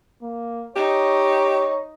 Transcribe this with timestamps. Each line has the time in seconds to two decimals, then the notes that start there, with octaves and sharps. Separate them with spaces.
0.23 A#3
0.76 D#4 G4 C#5